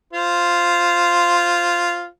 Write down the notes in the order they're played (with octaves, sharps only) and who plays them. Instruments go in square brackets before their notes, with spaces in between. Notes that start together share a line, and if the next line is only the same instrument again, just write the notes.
[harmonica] F4 C5